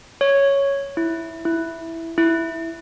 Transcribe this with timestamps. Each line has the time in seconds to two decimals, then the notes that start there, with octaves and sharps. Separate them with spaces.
0.21 C#5
0.97 E4
1.45 E4
2.18 E4